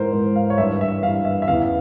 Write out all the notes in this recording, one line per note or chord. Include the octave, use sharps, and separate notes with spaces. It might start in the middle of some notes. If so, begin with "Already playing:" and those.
Already playing: G#2 E3 A#4 C5
G#2 E3
F5
C#5
G2 E3 E5
E5
G2 E3 F5
E5
E5
E2 C#3 E3 F5